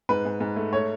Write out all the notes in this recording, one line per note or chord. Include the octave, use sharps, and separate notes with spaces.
G#2 B4
G#2
G#2
A3
A3 C#5